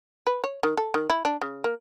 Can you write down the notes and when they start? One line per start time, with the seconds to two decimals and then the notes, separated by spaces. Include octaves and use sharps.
0.27 B4
0.44 C#5
0.63 D#3
0.77 A4
0.94 D#3
1.10 E4
1.25 D4
1.41 C#3
1.64 A#3